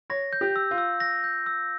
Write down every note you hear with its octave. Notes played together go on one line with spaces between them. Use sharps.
C#5 A#6
G6
G4
E6
F4
E6
A#6
G6
E6